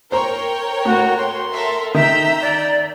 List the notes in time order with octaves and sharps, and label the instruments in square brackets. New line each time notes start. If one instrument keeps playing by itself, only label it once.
[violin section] A#4 C#5 G5 [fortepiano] C5 A#5
[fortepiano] A2 [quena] F#4
[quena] C6
[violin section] A4 A#4 E5
[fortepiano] D#3 [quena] E5 [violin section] A#5 E6 G6
[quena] D5